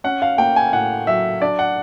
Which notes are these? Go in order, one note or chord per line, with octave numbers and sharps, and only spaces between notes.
C#4 F#5
F5
A#3 G5
G#5
A2 F#5
F#3 E5
D4 D5
F#5